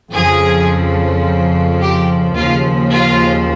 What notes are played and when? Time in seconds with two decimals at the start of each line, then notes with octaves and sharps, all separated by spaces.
0.12 F2 C#3 F3 G#4
1.80 G4
2.36 D#2 C#3 F3 F4
2.92 F4